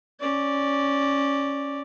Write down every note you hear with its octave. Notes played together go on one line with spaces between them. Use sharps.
C#4 D5